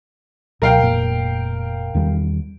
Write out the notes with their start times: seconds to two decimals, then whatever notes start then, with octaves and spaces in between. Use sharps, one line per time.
0.62 C#2 B2 F#3 A#4 F5 G5
0.83 F1 A#2
1.95 E2 D#3 G3